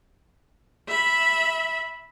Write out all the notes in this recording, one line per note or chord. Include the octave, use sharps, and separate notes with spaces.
E5 B5